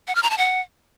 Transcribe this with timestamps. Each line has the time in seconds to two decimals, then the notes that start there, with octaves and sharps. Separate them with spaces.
0.08 F#5
0.15 F6
0.23 A#5
0.30 A5
0.38 F#5